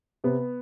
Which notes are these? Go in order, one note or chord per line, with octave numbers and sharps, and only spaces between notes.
C3 B3